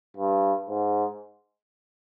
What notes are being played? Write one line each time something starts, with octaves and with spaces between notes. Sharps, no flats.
G2
G#2